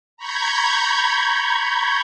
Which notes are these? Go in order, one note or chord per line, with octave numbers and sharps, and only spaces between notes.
A#5 B5 C#6 G6 G#6